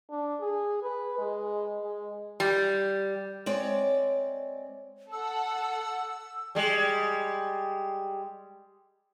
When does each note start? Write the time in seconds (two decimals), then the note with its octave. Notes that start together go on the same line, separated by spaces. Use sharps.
0.10 D4
0.40 G#4
0.83 B4
1.18 G#3
1.82 G#3
2.40 G3
3.46 G#3 C4 C#5 D5
5.12 A4 F#5 E6
6.55 G3 G#3